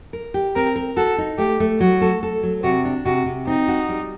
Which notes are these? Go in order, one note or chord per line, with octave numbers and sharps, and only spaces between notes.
A#4
G4
C4 A#4
A#4
F#4 A4
D#4
A3 G4
A3
F#3 F#4
A4
A4
F#3
C3 F#4
D4
C3 F#4
C3
C4 D#4
F#4
G3